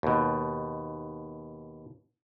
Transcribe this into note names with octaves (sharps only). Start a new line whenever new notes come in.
D#2 B2